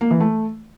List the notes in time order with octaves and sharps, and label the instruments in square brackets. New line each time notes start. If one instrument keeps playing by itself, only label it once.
[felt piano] A#3
E3
A3